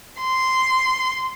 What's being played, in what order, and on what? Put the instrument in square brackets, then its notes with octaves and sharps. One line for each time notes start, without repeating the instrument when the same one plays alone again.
[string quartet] C6